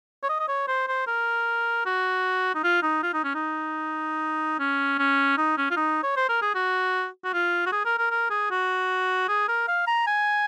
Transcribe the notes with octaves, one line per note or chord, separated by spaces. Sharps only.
C#5
D#5
D#5
C#5
C5
C5
A#4
F#4
D#4
F4
D#4
F4
D#4
C#4
D#4
C#4
C#4
D#4
C#4
F4
D#4
C#5
C5
A#4
G#4
F#4
F#4
F4
F#4
G#4
A#4
A#4
A#4
G#4
F#4
G#4
A#4
F5
A#5
G#5